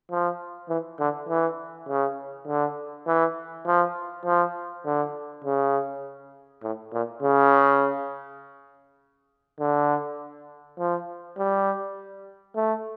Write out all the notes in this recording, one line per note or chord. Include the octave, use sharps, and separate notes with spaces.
F3
E3
D3
E3
C#3
D3
E3
F3
F3
D3
C#3
A2
A#2
C#3
D3
F3
G3
A3